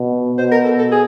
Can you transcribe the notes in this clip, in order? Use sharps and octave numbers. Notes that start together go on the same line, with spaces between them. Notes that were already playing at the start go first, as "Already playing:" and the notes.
Already playing: B2
B2 C5
A#4
A4
A4
G#4